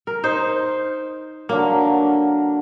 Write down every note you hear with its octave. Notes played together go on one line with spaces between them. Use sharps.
A#4
D#4 C5
D3 F#3 A#3 A#4